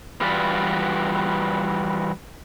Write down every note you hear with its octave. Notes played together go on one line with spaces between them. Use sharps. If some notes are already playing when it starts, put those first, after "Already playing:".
E3 G3 F4 F#4 B4 D5